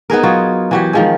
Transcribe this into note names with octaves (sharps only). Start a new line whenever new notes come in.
B3 D#4 G#4 A#4
F#3 F4
E3 F#3 G4
D#3 F3 G#3